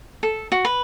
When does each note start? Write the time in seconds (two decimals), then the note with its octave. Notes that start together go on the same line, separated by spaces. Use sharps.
0.23 A4
0.52 F#4
0.65 B4